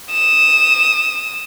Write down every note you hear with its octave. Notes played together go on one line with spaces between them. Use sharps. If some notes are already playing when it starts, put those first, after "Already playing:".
D#6 E7